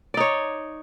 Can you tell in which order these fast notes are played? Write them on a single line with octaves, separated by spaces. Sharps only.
D5 D#4 C#5